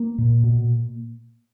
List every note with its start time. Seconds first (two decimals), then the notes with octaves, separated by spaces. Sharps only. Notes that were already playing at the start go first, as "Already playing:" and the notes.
Already playing: A#3
0.18 A#2
0.44 B2